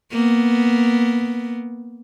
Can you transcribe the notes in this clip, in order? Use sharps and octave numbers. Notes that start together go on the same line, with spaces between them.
A#3 B3